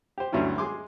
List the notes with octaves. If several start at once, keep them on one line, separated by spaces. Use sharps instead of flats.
G4 C5
D2 G2 F#3 C#4 E4
G#3 G#4 C6 D6